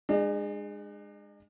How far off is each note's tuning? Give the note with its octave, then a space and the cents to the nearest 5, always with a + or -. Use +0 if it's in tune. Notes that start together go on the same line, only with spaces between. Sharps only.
G#3 -15 D4 +45